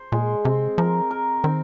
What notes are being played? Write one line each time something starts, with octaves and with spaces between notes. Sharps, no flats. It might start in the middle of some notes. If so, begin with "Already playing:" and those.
Already playing: C5
A#2 G#3
C3 C4
F3 A#4
A#4
D#3 C4